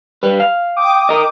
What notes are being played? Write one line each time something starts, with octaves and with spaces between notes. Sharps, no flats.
G3 B4
F5
G5 D6 D#6
A#4 D#5